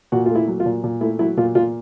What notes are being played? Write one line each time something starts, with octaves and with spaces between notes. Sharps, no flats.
A#2 F#4
A3 F4
E4
F#3
F4
A#2
A#2
A3 E4
F#3 E4
A#2 F4
A#2 F4